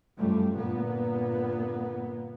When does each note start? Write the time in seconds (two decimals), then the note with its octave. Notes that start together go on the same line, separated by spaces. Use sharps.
0.17 F#2 F3 G3 A3
0.56 G1 A#2 A#3 B3